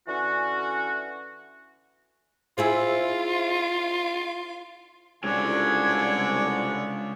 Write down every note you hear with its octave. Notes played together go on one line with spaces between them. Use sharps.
D3 E3 C#4 F#4
E4 F4 G#4 C5
C2 D3 G#3 C#4 D4 C#5 G#5